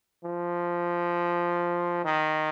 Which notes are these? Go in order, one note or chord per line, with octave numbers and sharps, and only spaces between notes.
F3
D#3